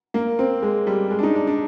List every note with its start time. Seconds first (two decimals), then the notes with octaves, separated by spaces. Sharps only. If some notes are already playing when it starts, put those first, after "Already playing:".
0.14 A#3
0.39 C4
0.63 G#3
0.87 G3
1.11 G#3
1.19 D4
1.23 D#4
1.35 D4
1.47 D4